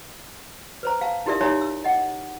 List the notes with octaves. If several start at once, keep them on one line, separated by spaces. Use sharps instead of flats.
B4 C5 A#5
F5 A5
D#4 E4 G4 A#4 D5 E5
D#4 G4 C#5 E5 A#5
E6
D#5 F#5